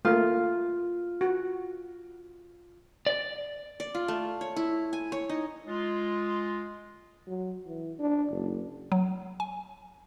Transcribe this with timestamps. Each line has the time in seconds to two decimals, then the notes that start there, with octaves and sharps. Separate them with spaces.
0.05 A3 A#3 F4
1.21 F#4
3.06 D5
3.80 D5
3.95 F4
4.08 A3
4.41 C#5
4.56 E4
4.93 G#5
5.12 C#5
5.30 D#4
5.67 G#3 F4
7.28 F#3
7.67 E3
7.99 D4
8.30 F#1
8.92 F#3
9.40 G#5